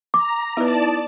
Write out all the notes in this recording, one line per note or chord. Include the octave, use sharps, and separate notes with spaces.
A#5 D6
B3 D#4 E4 B4 D5 A5 D#6